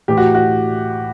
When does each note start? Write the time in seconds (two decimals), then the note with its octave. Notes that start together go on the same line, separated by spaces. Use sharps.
0.08 A2 E3 G4
0.17 F#4
0.34 F#4